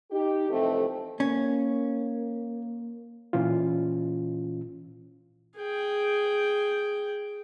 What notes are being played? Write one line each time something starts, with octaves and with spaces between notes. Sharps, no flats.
D#4 G4
F2 C3 E3 A3 C4 A4
A#3 C#4
A#2 E3 C#4 F4
G#4 G5